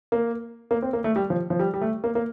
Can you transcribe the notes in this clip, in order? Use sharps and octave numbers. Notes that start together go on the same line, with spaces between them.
A#3
A#3
C4
A#3
A3
G3
F3
F3
G3
G3
A3
A#3
A#3